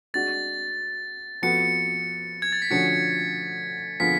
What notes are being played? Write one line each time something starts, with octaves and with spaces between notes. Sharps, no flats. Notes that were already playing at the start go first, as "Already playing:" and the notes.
G#3 D4 F#4 A6
F3 B3 F#4 A4 C#7
G#6
A6
B6
D3 F3 A3 C#4 F#4 C#7
D3 F3 B3 F4 G#4 B6